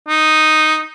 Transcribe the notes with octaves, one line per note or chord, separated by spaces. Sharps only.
D#4